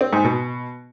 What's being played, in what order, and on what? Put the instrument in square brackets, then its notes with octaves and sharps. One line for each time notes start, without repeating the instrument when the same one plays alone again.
[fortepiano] C4
G#2
B2